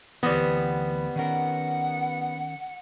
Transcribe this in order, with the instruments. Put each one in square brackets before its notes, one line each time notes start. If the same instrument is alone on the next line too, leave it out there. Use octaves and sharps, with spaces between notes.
[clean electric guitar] D2 E3 [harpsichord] G3 C4 D#5 [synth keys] B3
[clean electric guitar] D#3 C#4 A#4 [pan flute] F#5